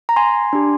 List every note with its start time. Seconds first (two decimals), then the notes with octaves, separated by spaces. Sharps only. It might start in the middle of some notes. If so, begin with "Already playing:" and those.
0.09 A#5
0.16 G#5 C6
0.53 D4 G4